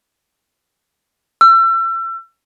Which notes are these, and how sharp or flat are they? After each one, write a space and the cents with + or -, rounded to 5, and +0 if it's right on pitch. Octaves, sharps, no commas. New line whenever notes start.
E6 +35